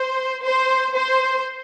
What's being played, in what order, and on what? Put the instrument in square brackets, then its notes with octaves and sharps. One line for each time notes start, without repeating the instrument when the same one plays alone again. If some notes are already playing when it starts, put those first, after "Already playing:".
Already playing: [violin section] C5
C5
C5